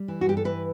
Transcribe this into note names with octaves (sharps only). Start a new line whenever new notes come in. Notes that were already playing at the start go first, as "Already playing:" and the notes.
Already playing: G3
E3
F#4
G2 G4
A4
E3 B4